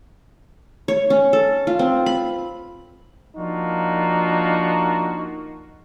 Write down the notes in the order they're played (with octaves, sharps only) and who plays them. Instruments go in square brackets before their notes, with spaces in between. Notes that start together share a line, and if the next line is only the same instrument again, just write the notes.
[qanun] C#5
C#4
A4
F4
C4
B5
[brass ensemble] F3 A#3 D4 D#4 F4 F#4